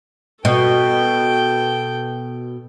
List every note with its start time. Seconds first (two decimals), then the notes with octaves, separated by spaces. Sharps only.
0.45 B2 A4 G5